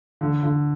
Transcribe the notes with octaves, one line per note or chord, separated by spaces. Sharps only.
D3
D3